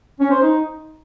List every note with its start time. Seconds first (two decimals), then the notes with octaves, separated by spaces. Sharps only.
0.20 C#4
0.31 C5
0.42 D#4